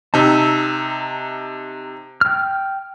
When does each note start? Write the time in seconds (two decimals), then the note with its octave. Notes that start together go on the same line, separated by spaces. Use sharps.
0.14 C3 D#4 A5 E6
2.21 G5 F6